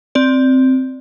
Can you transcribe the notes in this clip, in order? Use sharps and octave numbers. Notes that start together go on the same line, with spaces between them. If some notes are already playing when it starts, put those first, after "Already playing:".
C4 D5